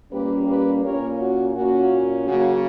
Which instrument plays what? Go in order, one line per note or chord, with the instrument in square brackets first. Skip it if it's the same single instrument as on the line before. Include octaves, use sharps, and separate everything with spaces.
[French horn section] A#2 G3 A#3 C#4 G4 B4
G4 B4
A#2 A#3 C#4 A#4 C#5
F#4
A#2 A#3 C#4 F#4
C#3 F#3 A#3 F#4